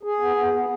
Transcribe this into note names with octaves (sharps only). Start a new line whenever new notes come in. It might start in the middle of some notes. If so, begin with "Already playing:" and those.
G#4
B3
B3
B3